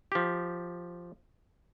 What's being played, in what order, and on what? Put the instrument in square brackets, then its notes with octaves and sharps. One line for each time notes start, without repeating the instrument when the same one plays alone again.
[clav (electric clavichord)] F3 G4